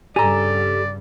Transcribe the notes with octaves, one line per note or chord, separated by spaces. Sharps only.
G2 C#3 G3 G4 A4 D5 G#5 A#5